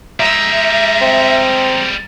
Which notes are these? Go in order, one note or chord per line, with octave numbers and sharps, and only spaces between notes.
G3 G#3 E5 A#5
C4